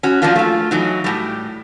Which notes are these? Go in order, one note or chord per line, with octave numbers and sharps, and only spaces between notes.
C#4 F#4
F3 F#3 A#3 D4 F4
A3 F4
E3 F#3 D#4
A2 G3